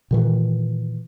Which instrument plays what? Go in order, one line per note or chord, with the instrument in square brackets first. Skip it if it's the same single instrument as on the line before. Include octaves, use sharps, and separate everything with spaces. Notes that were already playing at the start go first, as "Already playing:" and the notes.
[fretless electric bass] A#2 D#3 E3